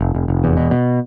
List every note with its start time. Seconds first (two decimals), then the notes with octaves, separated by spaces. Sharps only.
0.01 F1
0.15 F1
0.28 F1
0.44 E2
0.57 B2
0.71 B2